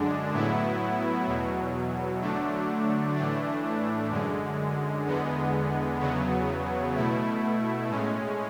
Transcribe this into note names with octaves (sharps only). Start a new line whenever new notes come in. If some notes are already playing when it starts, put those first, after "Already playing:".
Already playing: F#2 D3 G#3 D4
A2 F#3 B3 E4
E2 B2 F#3
D3 F#3 A3 D4
A2 E3 A3 D4
F#2 D3 G#3
E2 D3 G#3 B3
E2 C#3 F#3 B3
B2 A3 E4
A2 G#3 C#4